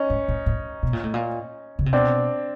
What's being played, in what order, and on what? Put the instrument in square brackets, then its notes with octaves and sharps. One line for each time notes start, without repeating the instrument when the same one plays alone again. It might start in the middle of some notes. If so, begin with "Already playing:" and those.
Already playing: [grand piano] C#4 D#4
[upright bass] G#2
A2
A2
B2
A#2
A2
A#2
C#3
C3
[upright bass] B2 [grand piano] C4 D4